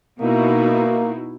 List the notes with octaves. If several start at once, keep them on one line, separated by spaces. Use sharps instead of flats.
B2 A#3 D#4 E4 F#4